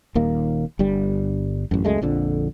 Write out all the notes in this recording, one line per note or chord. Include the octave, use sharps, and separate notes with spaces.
D#1 D#2 A#3
G1 G2 G3
A1 F#2
C#2 F#2 G#3 A3
A#1 F2 D3